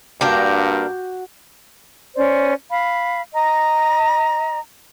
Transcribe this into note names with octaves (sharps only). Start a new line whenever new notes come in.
G2 A#3 D4 F#4 G4 A#4
C#4 C5 D5
F5 B5
D#5 A#5